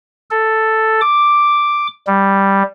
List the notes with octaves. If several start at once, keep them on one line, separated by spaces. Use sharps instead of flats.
A4
D6
G3